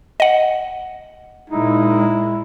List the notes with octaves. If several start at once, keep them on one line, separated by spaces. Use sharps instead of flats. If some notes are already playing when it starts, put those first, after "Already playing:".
D#5 F#5
A#2 G#3 D#4 E4